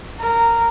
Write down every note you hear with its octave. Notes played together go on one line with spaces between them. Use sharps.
A#4